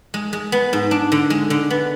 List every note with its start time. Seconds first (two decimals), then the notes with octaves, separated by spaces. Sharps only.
0.14 G#3
0.33 G#3
0.52 B3
0.73 G#2
0.91 D4
1.12 D3
1.30 G#3
1.50 D3
1.70 B3